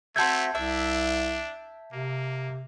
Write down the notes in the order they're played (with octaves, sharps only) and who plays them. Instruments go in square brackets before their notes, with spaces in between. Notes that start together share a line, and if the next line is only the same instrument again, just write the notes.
[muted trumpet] A3 [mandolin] C4 F#4 E5 [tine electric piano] A5 G6 G#6
[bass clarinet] C2 [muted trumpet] D4 [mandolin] E5
[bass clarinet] C3 [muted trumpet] A#3